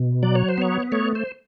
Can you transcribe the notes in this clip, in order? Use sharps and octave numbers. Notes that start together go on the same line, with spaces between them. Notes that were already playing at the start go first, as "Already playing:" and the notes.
Already playing: B2
F#3 D5
C#5
C5
B3 C#5
A3 C#5
C5